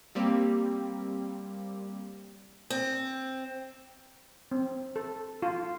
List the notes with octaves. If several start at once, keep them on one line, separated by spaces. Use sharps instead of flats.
G3 A#3 C4 G4
C4
C4
A4
F4